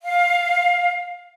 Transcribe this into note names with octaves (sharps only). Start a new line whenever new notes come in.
F5